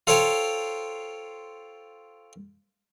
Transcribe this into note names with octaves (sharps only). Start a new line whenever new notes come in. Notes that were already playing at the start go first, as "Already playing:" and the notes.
F4 A4 C5 C#5 F5 G5